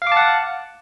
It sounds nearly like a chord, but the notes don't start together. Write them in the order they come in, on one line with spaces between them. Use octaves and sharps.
F5 D6 A5 F#5